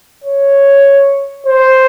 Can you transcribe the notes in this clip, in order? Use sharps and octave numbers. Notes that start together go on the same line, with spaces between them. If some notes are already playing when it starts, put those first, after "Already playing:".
C#5
C5